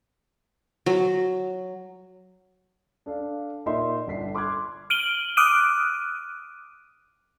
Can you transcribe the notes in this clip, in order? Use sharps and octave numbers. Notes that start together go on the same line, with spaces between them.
F#3
D4 A4 F5
A#2 D#4 A#4 E5 C6
G1 D4 B6 C7
C6 D6 F6 F#6 G#6
F6 D7 D#7 F#7 G7
D6 D#6 F6 F#6 D7 D#7